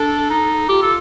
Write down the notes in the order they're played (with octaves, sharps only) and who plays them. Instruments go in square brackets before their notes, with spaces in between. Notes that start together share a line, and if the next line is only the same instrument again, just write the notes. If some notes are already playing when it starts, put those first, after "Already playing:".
Already playing: [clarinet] D4 [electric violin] A4
[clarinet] D#4
[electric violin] F4 [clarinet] G4
[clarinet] A4